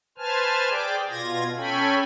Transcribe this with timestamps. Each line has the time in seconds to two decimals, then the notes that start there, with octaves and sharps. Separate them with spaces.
0.18 B4 C5 G#5 A5 F6
0.70 G#4 D5 G5 D6
1.10 B2 F4 G#6 A#6
1.57 C#4 A4 C#5 G5 G#5 B5